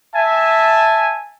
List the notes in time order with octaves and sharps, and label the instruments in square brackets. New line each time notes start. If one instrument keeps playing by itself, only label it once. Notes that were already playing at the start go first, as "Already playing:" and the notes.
[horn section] E5 G#5 A5